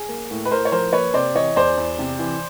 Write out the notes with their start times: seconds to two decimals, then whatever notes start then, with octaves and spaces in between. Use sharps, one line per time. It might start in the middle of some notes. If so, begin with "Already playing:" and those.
Already playing: G#4
0.08 A#3
0.31 A2
0.45 B4
0.51 A2 A#4 C5
0.65 C#5
0.72 F3 A#4 C5
0.93 A#3 B4 C#5
1.14 C3 C5 D5
1.35 E3 C#5 D#5
1.56 E2 C5 D5
1.77 E2
1.99 C3
2.19 E3